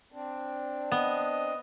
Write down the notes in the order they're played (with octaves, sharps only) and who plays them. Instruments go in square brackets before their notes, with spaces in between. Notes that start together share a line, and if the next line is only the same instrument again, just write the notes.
[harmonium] C4 D4
[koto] B3 [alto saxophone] D#5